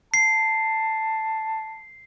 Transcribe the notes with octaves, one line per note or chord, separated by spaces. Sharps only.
A5 C7